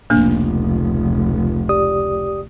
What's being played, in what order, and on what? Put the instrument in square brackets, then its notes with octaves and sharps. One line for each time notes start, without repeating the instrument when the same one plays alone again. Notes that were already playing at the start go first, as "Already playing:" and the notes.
[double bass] F1 C#2 [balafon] A#3 D4
[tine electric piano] G4 D5 D#6